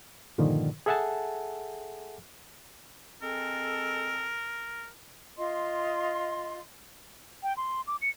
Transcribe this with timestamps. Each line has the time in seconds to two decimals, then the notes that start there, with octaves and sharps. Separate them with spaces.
0.38 G2 A#2 D3 D#3 F3
0.86 G#4 A4 E5 F#5 G#5 A5
3.22 G#3 C4 A4 A#4
5.38 F4 D#5 C6
7.43 G5
7.57 C6
7.87 D6
8.02 C#7